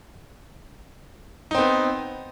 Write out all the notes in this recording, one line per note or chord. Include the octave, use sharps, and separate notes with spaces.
B3 C4 D#4